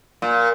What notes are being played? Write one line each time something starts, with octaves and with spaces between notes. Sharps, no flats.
A#2